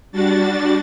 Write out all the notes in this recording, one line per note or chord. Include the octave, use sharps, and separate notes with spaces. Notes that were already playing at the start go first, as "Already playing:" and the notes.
G3 D4 F#4 A6